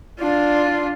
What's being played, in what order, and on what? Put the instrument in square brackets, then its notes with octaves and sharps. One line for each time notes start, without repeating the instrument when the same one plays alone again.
[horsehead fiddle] D4 F4